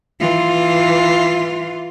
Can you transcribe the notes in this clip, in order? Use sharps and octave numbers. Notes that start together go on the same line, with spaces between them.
E3 F4